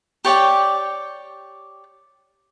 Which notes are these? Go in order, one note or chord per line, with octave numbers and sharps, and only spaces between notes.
G4 C#5 D5 G5